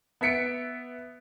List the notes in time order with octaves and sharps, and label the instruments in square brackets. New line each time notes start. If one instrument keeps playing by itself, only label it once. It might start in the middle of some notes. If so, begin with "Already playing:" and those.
[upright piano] B3 E5 B6 C#7 D7